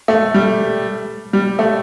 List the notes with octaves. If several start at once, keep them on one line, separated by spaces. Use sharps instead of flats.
A3
G3
G3
A3